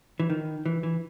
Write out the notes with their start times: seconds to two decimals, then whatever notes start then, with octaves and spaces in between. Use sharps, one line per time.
0.20 E3
0.30 D#3
0.66 E3
0.83 E3